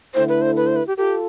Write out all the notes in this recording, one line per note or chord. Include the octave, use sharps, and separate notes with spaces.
D3 A3 E4 C5
B4
C5
B4
C5
B4
G4
F4 G4 A4